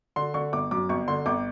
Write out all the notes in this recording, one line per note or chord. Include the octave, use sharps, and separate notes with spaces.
D3 C6
D3 C#6
G1 D6
F#2 D6
G1 C#6
D3 C6
G1 D6